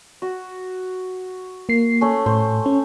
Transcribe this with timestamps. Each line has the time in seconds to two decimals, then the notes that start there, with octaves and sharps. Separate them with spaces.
0.22 F#4
1.69 A#3 C7
2.01 A3 C#4
2.26 A2 C5
2.66 C#4